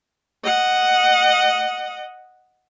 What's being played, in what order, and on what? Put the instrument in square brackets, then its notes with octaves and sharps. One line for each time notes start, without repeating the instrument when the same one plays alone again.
[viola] D#5 F#5